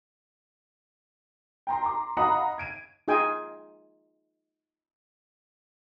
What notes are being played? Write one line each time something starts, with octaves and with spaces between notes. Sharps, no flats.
G5 A#5 C6
A#5 C6 D6
D#5 F5 F#5 A#5 B5 D#6
G#6 D7 D#7
D#4 F4 G#4 G5 G#5